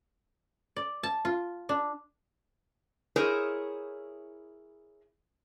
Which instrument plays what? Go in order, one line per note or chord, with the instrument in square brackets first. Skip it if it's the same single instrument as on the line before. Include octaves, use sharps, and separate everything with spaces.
[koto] D5
A5
F4
D4
[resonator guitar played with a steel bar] E4 G#4 A#4 C5 C#5 D#5